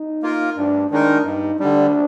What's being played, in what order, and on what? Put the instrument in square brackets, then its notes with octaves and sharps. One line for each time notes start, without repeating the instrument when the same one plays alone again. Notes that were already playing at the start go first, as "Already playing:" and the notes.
Already playing: [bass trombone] D#4
[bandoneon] A#3 F4 A#4
[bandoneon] G2 [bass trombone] D4
[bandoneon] D#3 G#3 D#4 A#4 [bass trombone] D4
[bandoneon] G2 [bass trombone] D#4
[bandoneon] D3 G3 [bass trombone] D4